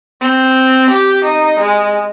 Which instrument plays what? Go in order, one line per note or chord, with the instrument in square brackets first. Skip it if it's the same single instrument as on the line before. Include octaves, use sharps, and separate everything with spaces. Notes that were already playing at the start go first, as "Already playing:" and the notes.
[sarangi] C4
G4
D#4
G#3